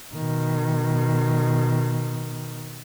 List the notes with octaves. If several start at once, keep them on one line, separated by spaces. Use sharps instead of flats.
B2 D#3